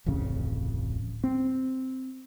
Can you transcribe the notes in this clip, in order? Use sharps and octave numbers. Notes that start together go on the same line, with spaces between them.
D1 A1 F2 C#3
C4